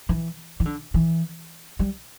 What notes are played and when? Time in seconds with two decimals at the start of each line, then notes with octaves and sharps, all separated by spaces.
0.09 E3
0.60 E3
0.66 D3
0.94 E3
1.79 G3